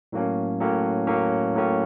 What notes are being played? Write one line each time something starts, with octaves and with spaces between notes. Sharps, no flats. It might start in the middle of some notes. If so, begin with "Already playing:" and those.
A2 F#3 A#3 C#4
A2 F#3 A#3 C#4
A2 F#3 A#3 C#4
A2 F#3 A#3 C#4